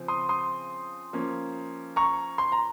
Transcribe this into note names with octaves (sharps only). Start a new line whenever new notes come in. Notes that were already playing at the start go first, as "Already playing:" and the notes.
Already playing: C#3 F3 C4
C6 D#6
C6 D#6
F3 A#3 C#4
A#5 C#6
C6
A#5